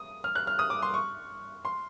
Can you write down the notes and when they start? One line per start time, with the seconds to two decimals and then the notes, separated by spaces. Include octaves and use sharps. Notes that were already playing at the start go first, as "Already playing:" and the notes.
Already playing: D#6
0.24 F6
0.35 F#6
0.47 F6
0.59 D#6
0.70 D6
0.82 C6
0.94 C#6
1.65 C6